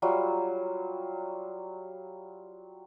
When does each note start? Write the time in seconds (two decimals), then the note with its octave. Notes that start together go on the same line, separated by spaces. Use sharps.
0.02 F#3 G3 F4